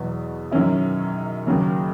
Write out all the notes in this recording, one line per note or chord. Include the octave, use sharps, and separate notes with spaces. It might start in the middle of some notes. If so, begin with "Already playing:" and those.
Already playing: E2 B2 F#3 B3
F#2 D#3 F#3 C#4 E4
D#2 C#3 F#3